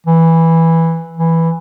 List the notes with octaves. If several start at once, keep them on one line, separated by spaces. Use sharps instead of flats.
E3
E3